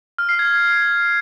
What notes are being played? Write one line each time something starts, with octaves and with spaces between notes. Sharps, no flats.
F6
C7
G#6